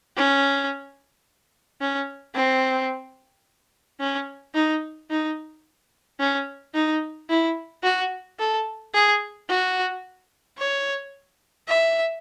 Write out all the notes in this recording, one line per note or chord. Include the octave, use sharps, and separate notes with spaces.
C#4
C#4
C4
C#4
D#4
D#4
C#4
D#4
E4
F#4
A4
G#4
F#4
C#5
E5